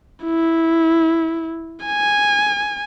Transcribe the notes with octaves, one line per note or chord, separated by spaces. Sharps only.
E4
G#5